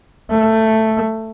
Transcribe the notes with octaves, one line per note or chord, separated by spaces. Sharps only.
A3